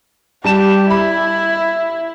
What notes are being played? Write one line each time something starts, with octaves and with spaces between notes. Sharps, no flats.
G3 G4 A5 E7
E4 B5